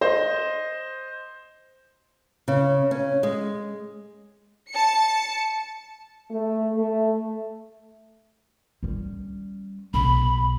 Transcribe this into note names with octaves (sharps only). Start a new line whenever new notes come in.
C5 D#5
C#3
C#4
G#3
A5 C#7
A3
A3
G3 C#4
B1 B5